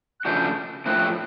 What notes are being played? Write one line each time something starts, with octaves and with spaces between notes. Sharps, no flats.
F#6
C#3 F3 A3 D4 F#4 G6
A2 F3 A3 C4 E4 F#6